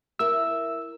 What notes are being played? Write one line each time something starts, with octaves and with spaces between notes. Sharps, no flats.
E4 A#4 E5 E6